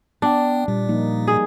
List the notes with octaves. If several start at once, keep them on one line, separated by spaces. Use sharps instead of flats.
B3 D4 G5
A#2 G3
F3 A#3 D#4
G#4